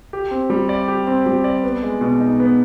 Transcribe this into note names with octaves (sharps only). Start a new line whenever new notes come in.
G4
C4
G3
D5
G4
C4
G3
D5
B3
G#3
B2
D#4
B3